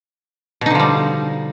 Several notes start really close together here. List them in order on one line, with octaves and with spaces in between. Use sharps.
B2 D#4 D3 F3 G3